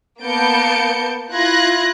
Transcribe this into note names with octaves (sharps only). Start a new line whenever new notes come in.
A#3 B3 A5 G6 C#7 D7
E4 F4 F#6 G#6 A#6